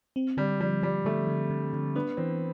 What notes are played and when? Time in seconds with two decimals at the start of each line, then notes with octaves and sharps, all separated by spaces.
0.16 C4
0.37 D3 G3
0.60 F3 G3
0.83 F3 G3
1.05 D3 A3
1.27 D3
1.50 D3
1.73 D3
1.95 B3 D4
2.17 E3 C4